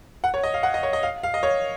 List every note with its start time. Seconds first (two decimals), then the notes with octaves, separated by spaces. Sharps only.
0.24 F#5
0.34 C#5
0.43 D#5
0.54 F5
0.63 F#5
0.74 D#5
0.83 C#5
0.93 D#5
1.03 F5
1.23 F5
1.34 D#5
1.43 C#5